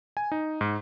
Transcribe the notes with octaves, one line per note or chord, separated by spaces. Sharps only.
G#5
D#4
G#2